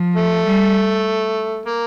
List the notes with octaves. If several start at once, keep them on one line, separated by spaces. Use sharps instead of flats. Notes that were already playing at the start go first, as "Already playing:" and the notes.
Already playing: F3
A3
G3
A#3